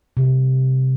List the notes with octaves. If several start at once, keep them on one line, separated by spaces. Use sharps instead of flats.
C3